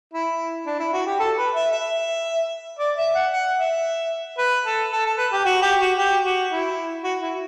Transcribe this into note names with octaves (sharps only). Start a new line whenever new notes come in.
E4
D4
E4
F#4
G4
A4
B4
E5
E5
D5
E5
F#5
F#5
E5
B4
A4
A4
A4
B4
G4
F#4
G4
F#4
G4
F#4
E4
F#4
E4